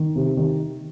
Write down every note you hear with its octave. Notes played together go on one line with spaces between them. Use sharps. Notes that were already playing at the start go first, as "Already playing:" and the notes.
Already playing: D#3
C3
D#3